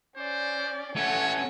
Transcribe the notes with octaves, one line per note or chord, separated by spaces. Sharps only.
C#4 C5 D5
A3 C#4 A4 C#5 F#5